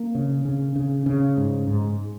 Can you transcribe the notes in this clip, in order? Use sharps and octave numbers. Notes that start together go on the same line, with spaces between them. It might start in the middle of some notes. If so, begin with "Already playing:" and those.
Already playing: A#3
C#3
C#3
C#3
C#3
G#2
G#2